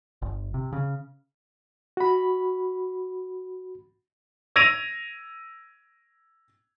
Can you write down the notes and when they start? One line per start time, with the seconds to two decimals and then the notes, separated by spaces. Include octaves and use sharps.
0.22 G1
0.54 C3
0.73 C#3
1.97 F#4 B5
4.56 E6 G#6 A#6 D7 D#7 F7